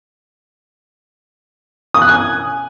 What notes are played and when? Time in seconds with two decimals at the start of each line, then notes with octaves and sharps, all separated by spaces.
1.94 D#6
2.02 F#6
2.09 G#5